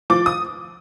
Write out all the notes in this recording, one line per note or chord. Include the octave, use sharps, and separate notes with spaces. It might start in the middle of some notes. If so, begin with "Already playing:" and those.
F3 D6
D#6